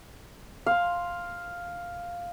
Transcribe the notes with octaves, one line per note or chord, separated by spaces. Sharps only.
F5 C6